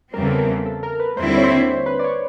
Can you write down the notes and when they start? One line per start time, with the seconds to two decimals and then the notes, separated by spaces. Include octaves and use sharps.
0.13 E2 C#3 E3 G3 C4 A#4
0.26 A4
0.39 A#4
0.66 A4
0.83 A#4
1.00 B4
1.17 D#2 D3 G3 C4 E4 C5
1.37 C#5
1.44 C5
1.86 B4
1.99 D5
2.04 C#5